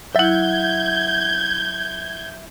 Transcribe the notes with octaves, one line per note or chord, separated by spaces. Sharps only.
F#3 E4 E5 F#5 G6 G#6